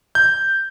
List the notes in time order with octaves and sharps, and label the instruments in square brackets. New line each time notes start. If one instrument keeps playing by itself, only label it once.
[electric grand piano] G6